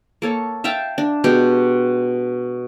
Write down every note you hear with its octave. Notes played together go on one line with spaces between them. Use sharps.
A#3 A4 C#5
E5 F5 G5 A5
D4
B2 G#3 G4 G5